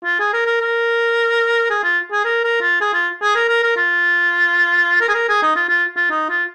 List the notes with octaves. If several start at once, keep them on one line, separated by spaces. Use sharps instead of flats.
F4
G#4
A#4
A#4
A#4
G#4
F4
G#4
A#4
A#4
F4
G#4
F4
G#4
A#4
A#4
A#4
F4
A#4
G#4
A#4
G#4
D#4
F4
F4
F4
D#4
F4